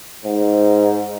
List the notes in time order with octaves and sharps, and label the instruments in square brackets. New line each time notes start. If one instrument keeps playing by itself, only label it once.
[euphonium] G#2